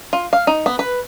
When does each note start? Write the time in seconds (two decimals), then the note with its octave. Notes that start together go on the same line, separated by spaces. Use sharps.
0.13 F4
0.33 F5
0.47 D#4
0.66 B3
0.79 B4